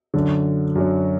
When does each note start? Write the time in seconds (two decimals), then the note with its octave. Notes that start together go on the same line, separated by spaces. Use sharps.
0.14 F#2 D3 F#3
0.75 F#2 D3 F#3